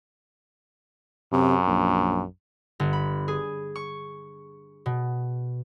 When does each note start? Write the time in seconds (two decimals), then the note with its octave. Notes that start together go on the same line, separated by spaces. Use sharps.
1.33 F#2 C3
1.67 A#1
2.80 G1
2.93 B5
3.28 G#4
3.76 C#6
4.86 B2